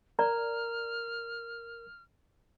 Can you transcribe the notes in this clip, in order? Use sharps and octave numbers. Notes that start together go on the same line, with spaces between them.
A#4 D5 A#5 F6